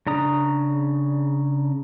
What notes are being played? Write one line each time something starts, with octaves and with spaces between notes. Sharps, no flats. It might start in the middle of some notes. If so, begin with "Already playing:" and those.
C#3 D4 A#5 D#6